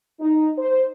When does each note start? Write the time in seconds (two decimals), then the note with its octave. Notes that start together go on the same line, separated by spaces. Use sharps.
0.20 D#4
0.57 C5